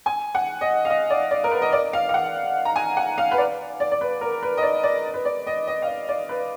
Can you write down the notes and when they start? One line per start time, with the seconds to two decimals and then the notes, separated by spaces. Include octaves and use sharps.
0.06 G#5
0.35 F#5
0.61 D#5
0.85 F5
0.90 D#5
1.10 D5
1.31 D5
1.44 A#4
1.51 B4
1.62 D#5
1.72 D5
1.93 F5
2.09 F5
2.14 F#5
2.65 A#5
2.76 G#5
2.97 F#5
3.18 F5
3.31 B4
3.38 D5
3.80 D5
3.92 D5
4.01 B4
4.21 A#4
4.43 B4
4.57 D#5
4.63 D5
4.84 D5
5.14 B4
5.25 D5
5.47 D#5
5.67 D#5
5.82 F5
5.88 D#5
6.09 D5
6.29 B4